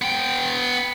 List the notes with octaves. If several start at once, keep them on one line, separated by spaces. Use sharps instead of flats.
B3 G5